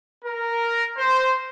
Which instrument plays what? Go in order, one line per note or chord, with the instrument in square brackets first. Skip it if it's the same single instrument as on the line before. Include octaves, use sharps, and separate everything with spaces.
[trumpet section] A#4
C5